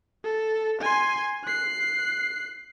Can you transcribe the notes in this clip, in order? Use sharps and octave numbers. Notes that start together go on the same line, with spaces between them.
A4
G#5 C6
F#6 C7